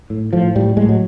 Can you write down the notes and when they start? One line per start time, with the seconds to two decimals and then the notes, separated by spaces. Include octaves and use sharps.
0.10 A2
0.33 A2 F3
0.55 A2 G3
0.77 A2 G#3
0.89 F#3